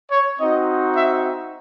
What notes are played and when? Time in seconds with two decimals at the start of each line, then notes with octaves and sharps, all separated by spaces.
0.11 C#5
0.39 C4 D#4 F#4 D#5
0.96 E5